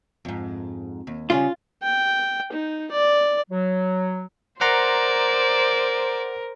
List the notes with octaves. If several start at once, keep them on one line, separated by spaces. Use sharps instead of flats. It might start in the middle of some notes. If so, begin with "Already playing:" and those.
F2 G#2
D#2
C#3 G3 C#4 F4 G#4
G5
D#4
D5
F#3
A#4 C5 D5 F#5 A#5 C6